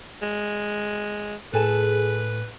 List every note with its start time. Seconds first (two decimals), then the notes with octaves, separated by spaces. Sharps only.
0.22 G#3
1.54 A2 G#4 A4 B4 G#5 A5